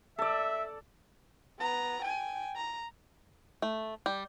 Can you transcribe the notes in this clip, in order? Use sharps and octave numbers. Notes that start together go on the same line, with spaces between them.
A4 D5 E5
B3 A#5
G5 G#5
A#5
A3
G3